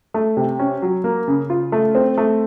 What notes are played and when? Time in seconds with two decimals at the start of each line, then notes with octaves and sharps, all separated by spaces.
0.14 A3
0.37 C3
0.59 C#4
0.82 F#3
1.04 A#3
1.28 C#3
1.50 F4
1.72 A3
1.95 C4
2.18 A3